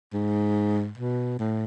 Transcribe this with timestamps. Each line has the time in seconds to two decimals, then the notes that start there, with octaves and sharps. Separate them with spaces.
0.14 G#2
0.98 B2
1.39 A2